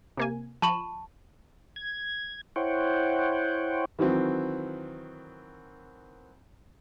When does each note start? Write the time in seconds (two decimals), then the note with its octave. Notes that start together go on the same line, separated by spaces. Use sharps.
0.17 C3 A#3 G#5
0.62 F3 A5 B5 C#6 E7
1.76 G#6
2.56 E4 C5 C#5 F#5 G5
3.99 D#3 E3 F#3 C4